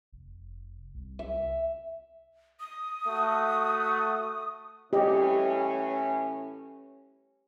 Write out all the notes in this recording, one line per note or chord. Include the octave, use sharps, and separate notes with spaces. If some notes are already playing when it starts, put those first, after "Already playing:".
F1
C2
E5
D#6
A3 F#4
A2 E3 C#4 G4 D#5